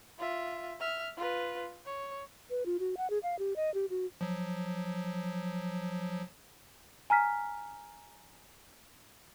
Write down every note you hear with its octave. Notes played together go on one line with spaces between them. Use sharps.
F4 E5
E5 F6
F4 B4
C#5
B4
F4
F#4
F#5
G#4
F5
G4
D#5
G4
F#4
F3 F#3
G#5 A#5 F6 B6